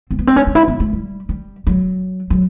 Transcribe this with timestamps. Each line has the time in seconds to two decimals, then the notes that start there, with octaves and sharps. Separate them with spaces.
0.11 C4
0.19 B3
0.27 C4
0.36 C#4
0.47 D4
0.55 E4
0.68 B3
0.80 A3
0.93 G3
1.29 G3
1.67 F#3
2.30 F#3